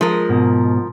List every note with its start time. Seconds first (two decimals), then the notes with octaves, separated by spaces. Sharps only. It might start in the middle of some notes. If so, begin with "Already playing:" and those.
0.01 F3 G#3 A#4
0.29 G#2 B2